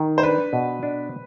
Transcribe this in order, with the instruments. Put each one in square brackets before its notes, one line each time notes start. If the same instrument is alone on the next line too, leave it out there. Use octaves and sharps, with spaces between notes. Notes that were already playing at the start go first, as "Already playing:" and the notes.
Already playing: [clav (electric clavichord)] D#3
[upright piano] C5
[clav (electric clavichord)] D4 [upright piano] B4
[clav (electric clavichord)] B2
D4